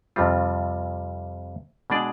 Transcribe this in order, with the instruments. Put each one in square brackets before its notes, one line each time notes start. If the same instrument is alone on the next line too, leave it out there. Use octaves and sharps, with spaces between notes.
[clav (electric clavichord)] F2 C3 G3 C4 F4
B2 G#3 D4 G#4 D5